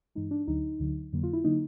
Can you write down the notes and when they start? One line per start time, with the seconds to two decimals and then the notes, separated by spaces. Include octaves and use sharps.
0.15 G2 E3 G#3 D#4
0.31 D4
0.48 D2 D3 F#3 D#4
0.80 D2 D3 F#3
1.13 F2 D3 F#3 A#3
1.23 F4
1.33 E4
1.44 D3 F#3 A#3 D#4